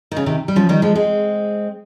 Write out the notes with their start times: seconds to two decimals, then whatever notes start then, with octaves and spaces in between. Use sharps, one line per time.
0.12 D#3
0.17 C#3
0.26 C3 D#3
0.48 G3
0.56 C#3 F3
0.69 D#3 G3
0.82 F3 G#3
0.95 G#3 C4